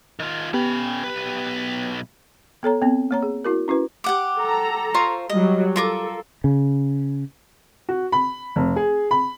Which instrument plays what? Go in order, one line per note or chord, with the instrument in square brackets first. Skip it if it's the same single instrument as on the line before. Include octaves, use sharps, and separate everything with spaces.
[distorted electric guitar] D#3 F4
[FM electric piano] B3 G4 G5 [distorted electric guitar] C#4 B5
[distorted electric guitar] B1 B4
[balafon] B3 A4 C#5 A#5
B3 C4
A#3 C#5 A#5
G#4
E4 F#4 A#4
C#4 E4 F#4 B4
[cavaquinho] G4 F#5 D6
[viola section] A4 A#5
[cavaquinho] F4 C5 C#6
[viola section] F#3 G3 [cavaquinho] D#5
[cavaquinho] F4 A#4 D6 [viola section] A4
[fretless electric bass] C#3
[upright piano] F#4
B5
F1
G#4
B5